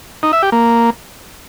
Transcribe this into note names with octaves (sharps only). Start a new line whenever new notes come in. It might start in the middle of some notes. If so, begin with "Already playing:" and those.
D#4
E5
G4
A#3